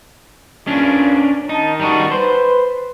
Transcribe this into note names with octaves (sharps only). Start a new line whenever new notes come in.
E2 A#2 C#4 D4
D#3 D#4 A5
G3 D#4 F#4
B4 C5